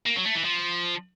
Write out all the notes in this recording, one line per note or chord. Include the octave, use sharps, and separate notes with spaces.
A#3
F#3
A3
E3
F3